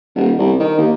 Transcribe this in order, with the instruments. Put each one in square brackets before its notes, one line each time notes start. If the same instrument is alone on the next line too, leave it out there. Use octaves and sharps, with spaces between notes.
[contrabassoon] D#1
C2
D#3
D#2